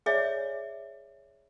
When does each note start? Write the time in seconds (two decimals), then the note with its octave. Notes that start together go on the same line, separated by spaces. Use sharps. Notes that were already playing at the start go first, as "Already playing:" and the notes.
0.06 G#4 C#5 D5 E5 G#5